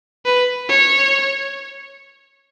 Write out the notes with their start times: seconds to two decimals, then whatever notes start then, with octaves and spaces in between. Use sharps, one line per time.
0.25 B4
0.69 C#5